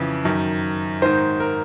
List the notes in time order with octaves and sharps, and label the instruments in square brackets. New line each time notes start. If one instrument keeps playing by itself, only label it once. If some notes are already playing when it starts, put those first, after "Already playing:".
Already playing: [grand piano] F2 C#3 E3
F#2 D#3
G#2 D#3 C5
A#4